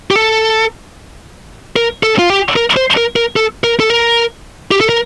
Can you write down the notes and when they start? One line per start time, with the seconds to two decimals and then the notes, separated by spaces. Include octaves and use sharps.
0.11 G4
0.16 A4
1.76 A#4
2.03 A4
2.19 F4
2.30 G4
2.56 A#4
2.77 C5
2.97 A#4
3.16 A#4
3.36 A4
3.64 A#4
3.80 A4
3.90 A#4
4.71 G4
4.81 A4
4.89 A#4